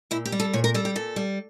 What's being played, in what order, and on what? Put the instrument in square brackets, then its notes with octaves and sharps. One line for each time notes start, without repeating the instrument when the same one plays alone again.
[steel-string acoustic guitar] A#2 E4
G4
G3
A4
A#2 C#5
A#4
G3 A4
G4
A#2 A4
G3